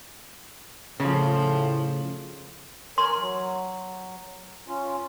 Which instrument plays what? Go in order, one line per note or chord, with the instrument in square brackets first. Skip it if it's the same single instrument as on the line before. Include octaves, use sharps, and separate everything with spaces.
[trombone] A2 [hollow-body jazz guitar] C#3 [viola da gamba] F3
[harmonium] A#4 C#5 G#5 [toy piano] C6
[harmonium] F#3
C#4 F4